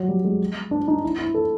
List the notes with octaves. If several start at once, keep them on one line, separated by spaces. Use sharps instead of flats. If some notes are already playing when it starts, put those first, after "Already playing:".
Already playing: F#3
G3
G#3
D4
D#4
E4
E4
A4